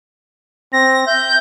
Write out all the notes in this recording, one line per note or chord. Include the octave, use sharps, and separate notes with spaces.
C4 A#6
E5 G6